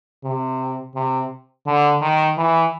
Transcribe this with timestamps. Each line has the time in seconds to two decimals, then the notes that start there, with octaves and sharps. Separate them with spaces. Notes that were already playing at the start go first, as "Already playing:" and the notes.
0.24 C3
0.95 C3
1.67 D3
2.02 D#3
2.38 E3